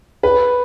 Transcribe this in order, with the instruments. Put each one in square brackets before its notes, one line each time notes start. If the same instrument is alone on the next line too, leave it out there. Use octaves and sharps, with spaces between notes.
[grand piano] B4